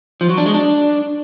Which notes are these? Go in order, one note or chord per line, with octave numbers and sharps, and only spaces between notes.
F3
F#3
D4
G#3
D4